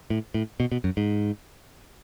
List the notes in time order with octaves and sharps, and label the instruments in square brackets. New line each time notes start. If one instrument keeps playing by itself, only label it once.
[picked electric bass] A2
A2
B2
B2
F#2
G#2